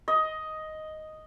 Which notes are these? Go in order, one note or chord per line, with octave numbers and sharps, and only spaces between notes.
D#5